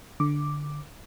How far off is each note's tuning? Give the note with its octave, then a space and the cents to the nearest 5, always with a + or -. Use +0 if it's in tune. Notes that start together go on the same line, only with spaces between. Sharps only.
D3 +0 D6 +0